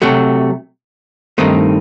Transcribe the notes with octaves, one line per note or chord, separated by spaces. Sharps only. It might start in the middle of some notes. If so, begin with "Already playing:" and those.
C3 F#3 A3
G2 D#3 A3 C4 D#4